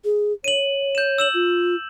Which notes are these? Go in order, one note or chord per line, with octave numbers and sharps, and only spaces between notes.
G#4
C#5 D#7 F#7
G6 E7
E6 E7 F#7
F4